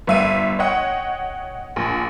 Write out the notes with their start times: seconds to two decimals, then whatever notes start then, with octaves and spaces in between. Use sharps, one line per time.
0.07 G1 E5 D#7
0.59 C#5 D#5 F#5 G5
1.76 A#1